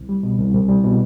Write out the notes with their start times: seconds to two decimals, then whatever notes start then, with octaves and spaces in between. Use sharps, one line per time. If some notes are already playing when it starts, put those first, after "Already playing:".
Already playing: C2
0.09 G3
0.23 B2
0.38 C2
0.54 C2
0.69 G3
0.84 B2